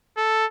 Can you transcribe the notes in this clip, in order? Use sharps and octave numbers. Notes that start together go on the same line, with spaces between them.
A4